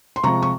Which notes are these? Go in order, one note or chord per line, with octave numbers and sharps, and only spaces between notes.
C6
C3 F3 G#3 A#5 C#6
C#6